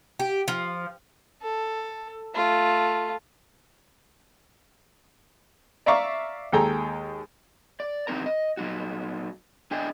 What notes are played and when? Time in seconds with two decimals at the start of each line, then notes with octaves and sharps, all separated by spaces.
0.19 G4
0.48 F3
1.42 A4
2.34 A3 F4
5.86 D5 E5 F5 A#5 C#6 D6
6.52 D#2 G#3 A4 G5 G#5 A#5
7.80 D5
8.07 F#2 E3 C4 D#4 A#4 A#5
8.26 D#5
8.57 A#2 F#3 D#4 F#4
9.71 D4 G#4 D5 D#5 G5 G#5